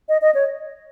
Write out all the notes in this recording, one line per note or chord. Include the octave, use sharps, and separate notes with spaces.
D#5
D#5
C#5